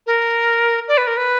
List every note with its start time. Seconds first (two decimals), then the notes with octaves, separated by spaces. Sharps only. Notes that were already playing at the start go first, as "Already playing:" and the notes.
0.07 A#4
0.88 D5
0.97 B4
1.07 A#4
1.17 B4